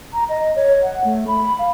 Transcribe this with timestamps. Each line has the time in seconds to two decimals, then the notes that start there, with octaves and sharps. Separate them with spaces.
0.13 A#5
0.29 D#5
0.56 C#5
0.83 F#5
1.04 A3
1.27 B5
1.59 F5